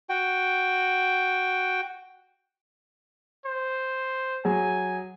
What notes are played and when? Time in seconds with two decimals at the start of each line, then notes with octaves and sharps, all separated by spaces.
0.09 F#4 G5
3.45 C5
4.45 F#3 G#4 G#5